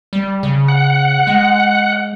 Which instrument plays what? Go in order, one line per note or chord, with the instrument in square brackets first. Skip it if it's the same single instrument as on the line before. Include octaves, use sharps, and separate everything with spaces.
[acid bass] G3
C#3
[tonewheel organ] F#5
[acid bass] G#3